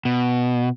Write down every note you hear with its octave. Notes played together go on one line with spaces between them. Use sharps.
B2